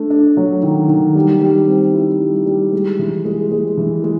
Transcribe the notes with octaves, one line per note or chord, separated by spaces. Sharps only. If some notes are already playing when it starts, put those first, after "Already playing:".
Already playing: A3 D4
D4
F#3
D#3
D#3
G3
G3
C4
E4
G3
G3
G#3
E3
G#3
G#3
E3
G#3